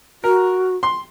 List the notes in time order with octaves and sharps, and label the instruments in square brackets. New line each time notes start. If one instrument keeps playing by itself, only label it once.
[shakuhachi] F#4 [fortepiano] A#4
[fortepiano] C6